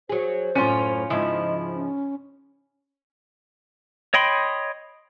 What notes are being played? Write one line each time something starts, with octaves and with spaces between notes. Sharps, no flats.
F#3 G#4 C5
F#2 A2 C#4 F4
G#2 C#3 F3 E4 D#5
C#4
C#5 D#5 G5 B5 C6